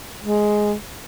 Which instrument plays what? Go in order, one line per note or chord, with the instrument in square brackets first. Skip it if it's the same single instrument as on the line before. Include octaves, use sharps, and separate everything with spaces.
[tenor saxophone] G#3